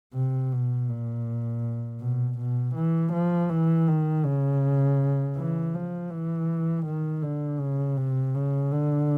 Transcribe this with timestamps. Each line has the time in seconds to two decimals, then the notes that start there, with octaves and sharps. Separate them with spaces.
0.14 C3
0.53 B2
0.89 A#2
2.01 B2
2.39 B2
2.75 E3
3.13 F3
3.50 E3
3.88 D#3
4.25 C#3
5.37 E3
5.74 F3
6.11 E3
6.86 D#3
7.22 D3
7.60 C#3
7.97 C3
8.35 C#3
8.72 D3